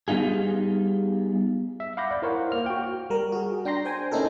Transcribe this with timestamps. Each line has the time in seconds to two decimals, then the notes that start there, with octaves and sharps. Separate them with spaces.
0.08 G3 B3 D#4 F4 G#4
1.80 E5
1.97 F5 F#5 B5 D6 G6 A#6
2.11 D5
2.22 E4 A#4 C5 C#5 F5 F#5
2.52 A#3 F6
2.66 F#4 G5
3.10 G3 A#4
3.32 F#4 G#4
3.65 D4 G5 A#5 C6 A#6
3.85 C5 G5 G#5
4.11 A3 C#4 D#4 E4 A4 A#4